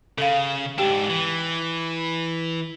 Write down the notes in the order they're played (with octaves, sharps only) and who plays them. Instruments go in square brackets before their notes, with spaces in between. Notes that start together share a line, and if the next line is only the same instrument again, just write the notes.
[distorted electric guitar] C#3 [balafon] A4 F5
[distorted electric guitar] G#2 D4 [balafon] G4 G5
[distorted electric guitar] E3